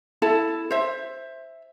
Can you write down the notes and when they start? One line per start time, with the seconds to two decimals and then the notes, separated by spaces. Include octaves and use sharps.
0.22 E4 A4 A5
0.71 C5 E5